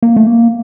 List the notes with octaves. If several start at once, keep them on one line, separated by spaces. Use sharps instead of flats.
A#3
A3
A#3